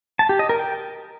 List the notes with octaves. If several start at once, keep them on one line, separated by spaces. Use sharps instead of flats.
A5
G4
D#5
A#4
G5